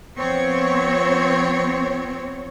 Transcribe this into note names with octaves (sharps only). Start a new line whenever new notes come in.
F3 B3 C4 C#5